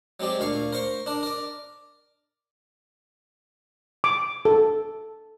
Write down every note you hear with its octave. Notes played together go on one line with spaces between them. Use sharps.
F#3 G#3 C4 G4 D5
D2 A#2 F5 C#6
A#4 C5 C#6
D4 A#4
A#4 D5
D6
A4